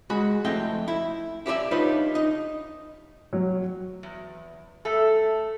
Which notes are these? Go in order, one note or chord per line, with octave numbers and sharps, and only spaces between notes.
G#3 F#4 B5
F2 A3 C4 E4 D#5 G5
E4
E4 G4 B4 D5 E5
D4 D#4 F4 G4 B4 C#5
D#4 D#5
F#3
E2
A3 A4